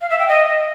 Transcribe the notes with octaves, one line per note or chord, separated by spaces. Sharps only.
F5
E5
G5
D#5